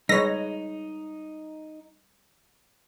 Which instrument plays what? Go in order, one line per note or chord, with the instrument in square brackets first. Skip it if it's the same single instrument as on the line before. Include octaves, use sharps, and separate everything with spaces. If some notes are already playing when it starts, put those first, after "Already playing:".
[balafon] G3 [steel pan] G#3 B4 C#5 [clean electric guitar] D#4 [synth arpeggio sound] A#6